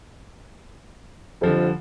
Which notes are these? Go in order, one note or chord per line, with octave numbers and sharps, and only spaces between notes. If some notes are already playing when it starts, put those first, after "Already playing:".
F2 D3 F3 G3